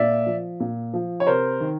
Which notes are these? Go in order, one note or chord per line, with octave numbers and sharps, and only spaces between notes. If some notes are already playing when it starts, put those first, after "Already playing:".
Already playing: A#2 D5 E5
F3
A#2
F3
C#5
C3 A#4 C5
D#3